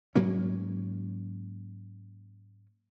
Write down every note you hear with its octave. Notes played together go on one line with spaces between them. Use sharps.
G#2 F#3 A#3 C#4